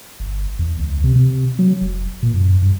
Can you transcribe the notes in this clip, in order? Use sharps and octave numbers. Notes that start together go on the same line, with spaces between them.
G1
E2
C#2
C3
C3
F#3
F1
A#2
F#2
G2